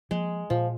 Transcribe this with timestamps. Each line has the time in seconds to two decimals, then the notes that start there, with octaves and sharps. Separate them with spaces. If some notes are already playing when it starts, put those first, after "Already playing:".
0.11 F3 G#3 A#3
0.50 A#2 F3